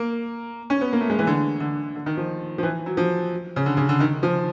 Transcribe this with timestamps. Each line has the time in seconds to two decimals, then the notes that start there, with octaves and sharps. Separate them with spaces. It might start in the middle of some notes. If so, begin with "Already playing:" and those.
Already playing: A#3
0.70 C#4
0.81 B3
0.93 A#3
1.01 A3
1.10 G#3
1.19 E3
1.27 D3
1.60 D3
1.95 D3
2.06 D#3
2.17 F3
2.58 F3
2.63 E3
2.86 F#3
2.97 F3
3.56 C#3
3.66 D3
3.77 C#3
3.89 D3
4.00 D#3
4.23 F3